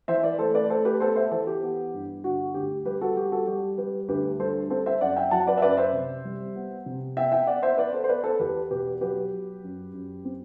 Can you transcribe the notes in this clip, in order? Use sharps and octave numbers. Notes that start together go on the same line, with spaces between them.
E3 C5 E5
B4 D5
A3 A4 C5
B4 D5
A3 A4 C5
G4 B4
B3 A4 C5
C5 E5
E3 A4 C5
G4
B3
G2
D3 F#4
D2 G4
G3 G4 B4
F#4 A4
G3 G4
F#4 A4
G3 G4
G3 G4 B4
D2 G4 B4
G3 A4 C5
C4 A4 C5
C5 E5
F#2 D5 F#5
E5 G5
F#3 F#5 A5
B4 D5
E5
F#2 B4 D5
C5 E5
C3
G3
B3
C3
B3 E5 G5
E5 G5
B3 D5 F#5
C5 E5
B3 B4 D5
A4 C5
C5
B3 B4 D5
A4 C5
E2 G4 B4
B2 G4 B4
F#3 G4 B4
F#3
F#2
F#2
C4